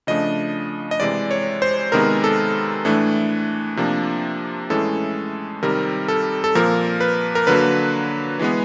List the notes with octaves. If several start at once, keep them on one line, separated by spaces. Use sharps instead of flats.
C#3 F3 A3 D4 D#5
D#5
C3 E3 G#3 D5
C#5
C5
C3 D#3 G#3 B3 A#4
A4
A2 E3 A3 D4
C3 F3 A#3 D4
A2 E3 G#3 C#4 A4
C3 D#3 G3 C4 A#4
A4
A4
A#2 F3 A#3 A#4
B4
A#4
D3 F#3 A#3 B4
E3 G#3 B3